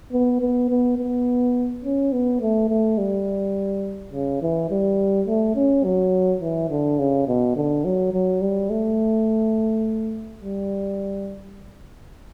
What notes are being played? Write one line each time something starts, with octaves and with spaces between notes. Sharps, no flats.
B3
B3
B3
B3
C#4
B3
A3
A3
G3
C#3
E3
G3
A3
C#4
F#3
E3
D3
C#3
B2
D3
F#3
F#3
G3
A3
G3